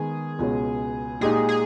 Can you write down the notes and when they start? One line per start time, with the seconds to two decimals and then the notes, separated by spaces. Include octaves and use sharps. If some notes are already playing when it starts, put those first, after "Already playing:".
Already playing: D#3 G#3 B3 G#4
0.39 C#2 B2 G#3 C#4
1.21 A#2 G#3 D#4 G4 G#4
1.49 G#4